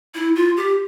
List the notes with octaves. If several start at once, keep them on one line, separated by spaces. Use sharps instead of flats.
E4
F4
G4